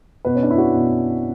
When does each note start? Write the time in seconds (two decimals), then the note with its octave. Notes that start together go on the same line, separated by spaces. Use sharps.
0.25 B2 B4
0.35 C#4
0.43 D4
0.50 E4
0.58 F#4
0.74 B2